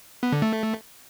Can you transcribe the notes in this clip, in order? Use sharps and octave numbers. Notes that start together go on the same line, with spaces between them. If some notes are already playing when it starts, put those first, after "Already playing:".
B3
D3
A3